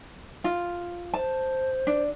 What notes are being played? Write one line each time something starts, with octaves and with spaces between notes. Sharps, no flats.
F4
C5 A5
D4